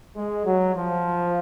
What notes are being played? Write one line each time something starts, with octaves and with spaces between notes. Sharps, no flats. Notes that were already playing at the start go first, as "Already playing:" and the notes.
G#3
F#3
F3